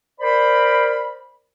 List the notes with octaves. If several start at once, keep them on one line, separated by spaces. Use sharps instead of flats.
A#4 C5 D5 B5